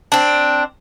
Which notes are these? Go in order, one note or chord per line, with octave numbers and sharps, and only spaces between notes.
C4 D4